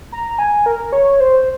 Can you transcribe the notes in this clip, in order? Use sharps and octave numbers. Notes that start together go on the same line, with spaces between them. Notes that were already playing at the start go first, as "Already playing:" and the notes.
A#5
G#5
A#4
C#5
C5